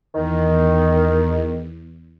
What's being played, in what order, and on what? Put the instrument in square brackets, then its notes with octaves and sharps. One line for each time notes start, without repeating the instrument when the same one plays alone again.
[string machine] E2 [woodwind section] D#3